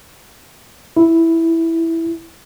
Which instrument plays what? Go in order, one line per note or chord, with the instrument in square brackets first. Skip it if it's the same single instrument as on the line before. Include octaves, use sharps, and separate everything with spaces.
[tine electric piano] E4